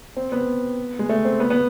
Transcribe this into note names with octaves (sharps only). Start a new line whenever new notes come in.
C4
B3
G#3
A3
C4
B3
B3